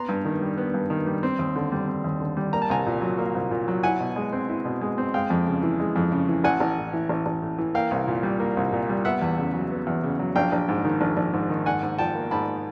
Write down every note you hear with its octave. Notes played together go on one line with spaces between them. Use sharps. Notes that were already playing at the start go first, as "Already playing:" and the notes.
Already playing: B3 A#5 C6
G2
D#3
G3
B3
G2
D#3
G3
C4
D#2
D3
G3
C4
D#2
D3
G3
A#3 A#5
A5
C2 G#5 A#5
A#2
F#3
A#3
C2
A#2
F#3
E4 F#5 G#5
B2
G#3
C4
E4
B2
G#3
C4
G#3 F5 G5
F2
C#3
E3
G#3
F2
C#3
E3
A1 F#5 G#5
A1
A2
E3
A1
A1
A2
E3
A#3 F5 G5
C2
A#2
G3
A#3
C2
A#2
G3
B3 E5 F#5
E2
C#3
F#3
B3
E2
C#3
F#3
A#1 F5 G5
A#1
G#2
D#3
A#1
A#1
G#2
D#3
G#2 F#5 G#5
G#2
F3 G5 A5
A#3
G#2 A5 B5